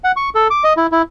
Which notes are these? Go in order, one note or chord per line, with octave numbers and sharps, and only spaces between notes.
F#5
C#6
A4
D6
D#5
E4
E4